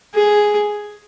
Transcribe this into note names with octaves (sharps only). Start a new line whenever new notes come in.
G#4